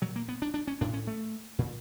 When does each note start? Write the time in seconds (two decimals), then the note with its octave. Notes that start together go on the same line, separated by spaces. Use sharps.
0.02 A#2 F#3
0.16 A#3
0.29 B3
0.42 D4
0.54 D4
0.67 C#4
0.81 A2 D4
0.93 C#4
1.07 A3
1.59 A#2